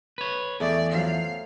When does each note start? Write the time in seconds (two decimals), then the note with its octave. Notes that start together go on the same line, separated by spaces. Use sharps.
0.18 B4 C#5
0.60 E2 A3 G#4 D5
0.92 F3 F#3 F5